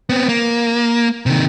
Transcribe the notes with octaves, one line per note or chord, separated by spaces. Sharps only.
B3 C4
A#3
C3 D#3